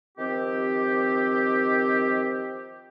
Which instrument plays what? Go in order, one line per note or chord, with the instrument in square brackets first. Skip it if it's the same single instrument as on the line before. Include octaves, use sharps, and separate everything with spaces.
[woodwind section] D#3 F3 C4 G4